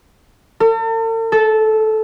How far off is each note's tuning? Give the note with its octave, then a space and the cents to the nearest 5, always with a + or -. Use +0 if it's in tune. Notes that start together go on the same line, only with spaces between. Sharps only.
A4 +45
A4 -15